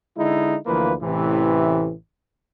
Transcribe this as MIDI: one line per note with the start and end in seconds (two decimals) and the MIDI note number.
0.17 0.55 50
0.17 0.55 56
0.17 0.55 63
0.17 0.55 64
0.66 0.93 38
0.66 0.93 52
0.66 0.93 53
0.66 0.93 58
0.66 0.93 71
1.01 1.93 33
1.01 1.93 45
1.01 1.93 48
1.01 1.93 52